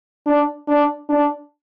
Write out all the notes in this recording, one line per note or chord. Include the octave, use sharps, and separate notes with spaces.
D4
D4
D4